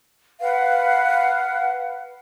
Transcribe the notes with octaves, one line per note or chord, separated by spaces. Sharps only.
B4 F5 F#5